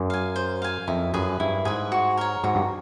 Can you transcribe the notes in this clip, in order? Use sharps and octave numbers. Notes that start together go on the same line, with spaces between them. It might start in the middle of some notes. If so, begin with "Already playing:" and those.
Already playing: F#2
F5 G#5
C5
F5 G#5
F2 E4
F#2 G#4 B4
G2 E4
G#2 G#4 B4
F#4
A#4 C#5
G#2 F#4
G2